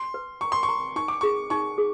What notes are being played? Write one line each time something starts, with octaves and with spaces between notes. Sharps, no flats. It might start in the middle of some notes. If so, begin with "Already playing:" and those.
Already playing: C6
B4
A#5 C#6
C6
C#6
A#5
D#4 C#6
D6
G#4 C#6
D#4 C#6
G#4